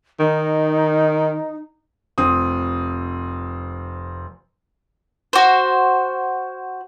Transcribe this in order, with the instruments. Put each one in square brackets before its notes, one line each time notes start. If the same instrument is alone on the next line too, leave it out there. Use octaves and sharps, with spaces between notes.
[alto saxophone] D#3 [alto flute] D#4
[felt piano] F1 C4 D#6
[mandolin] F#4 C5